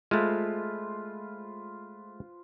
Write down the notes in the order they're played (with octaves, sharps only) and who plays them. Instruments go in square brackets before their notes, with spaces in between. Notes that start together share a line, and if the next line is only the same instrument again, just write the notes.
[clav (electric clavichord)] G#3 A3 [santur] F4 B4 C5